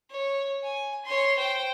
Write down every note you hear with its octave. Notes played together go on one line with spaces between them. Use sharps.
C#5
G#5
C#5 C6
C5 G5